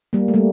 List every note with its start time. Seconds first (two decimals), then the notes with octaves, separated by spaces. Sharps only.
0.13 G3 A#3
0.28 A3
0.34 G3 A#3